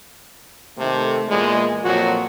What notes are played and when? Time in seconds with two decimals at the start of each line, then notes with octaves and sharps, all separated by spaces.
0.78 C3 D#3 A3
1.28 E2 A#2 G#3
1.83 F2 A#2 F#3 F#4